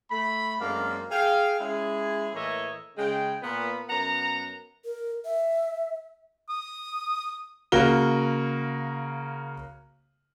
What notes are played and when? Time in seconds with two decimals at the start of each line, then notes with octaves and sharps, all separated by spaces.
0.10 A3 B5
0.61 F#2 G#3 A#3 C4 D4 F5
1.11 G#4 F5 G5
1.60 G#3 C#4 E4 G#4
2.34 A2 E3 A#3 C#5 D#5 E5
2.98 C#3 G#3 G5
3.42 A#2 B3 B5
3.89 F#2 B3 F#5 A#5
4.85 A#4
5.25 E5
6.49 D#6
7.72 C#3 A#3 F#4 G7